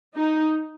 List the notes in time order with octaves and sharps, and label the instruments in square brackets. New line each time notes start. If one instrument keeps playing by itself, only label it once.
[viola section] D#4